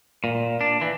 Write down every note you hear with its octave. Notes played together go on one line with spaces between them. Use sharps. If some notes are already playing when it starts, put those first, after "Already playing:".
A#2
D4
E3